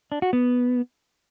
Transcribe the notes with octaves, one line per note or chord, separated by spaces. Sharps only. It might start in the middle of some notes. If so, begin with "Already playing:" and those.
D4
F#4
B3